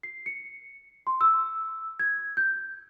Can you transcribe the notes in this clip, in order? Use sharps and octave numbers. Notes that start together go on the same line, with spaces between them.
C7
C#7
C6
E6
G#6
G6